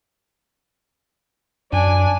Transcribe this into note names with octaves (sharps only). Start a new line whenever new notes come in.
F#2 D4 G#5